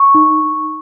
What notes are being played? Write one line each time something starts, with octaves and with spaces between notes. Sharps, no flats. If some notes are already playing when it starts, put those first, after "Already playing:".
Already playing: C#6
D#4